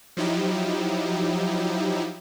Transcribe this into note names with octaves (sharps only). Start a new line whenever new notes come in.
F3 F#3 D#4 E4 G4